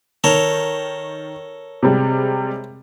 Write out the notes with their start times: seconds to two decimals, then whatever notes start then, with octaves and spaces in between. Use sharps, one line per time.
0.24 D#3 A4 A#4 C#5
1.83 C3 G3 G#3